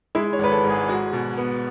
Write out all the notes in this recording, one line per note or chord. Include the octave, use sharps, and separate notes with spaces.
G#3 E4
C#5
G#1 B4
A4
G#2
G#4
G#3 F#4
B2
B3